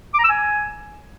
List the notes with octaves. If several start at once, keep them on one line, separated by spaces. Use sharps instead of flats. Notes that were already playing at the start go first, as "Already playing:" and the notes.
D6
A#5
E6
G#5